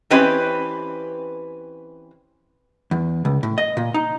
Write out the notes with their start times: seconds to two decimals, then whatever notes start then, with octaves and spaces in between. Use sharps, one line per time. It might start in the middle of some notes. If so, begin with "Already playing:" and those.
0.10 E3 C4 C#4 G4 B4 D#5
2.91 E2
3.25 C#2
3.43 A2
3.58 D#5
3.77 A#2
3.94 D#4